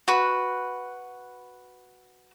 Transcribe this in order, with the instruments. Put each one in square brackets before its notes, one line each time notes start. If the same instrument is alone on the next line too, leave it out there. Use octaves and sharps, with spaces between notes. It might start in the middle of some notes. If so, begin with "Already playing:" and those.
[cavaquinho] F#4 B4